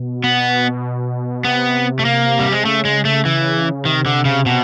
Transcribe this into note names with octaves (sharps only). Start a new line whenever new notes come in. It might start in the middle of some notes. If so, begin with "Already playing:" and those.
Already playing: B2
B3
C3 B3
A3
A#3
G3
G#3
C#3 A3
G#3
A3
E3
C3 D#3
D3
C#3
B2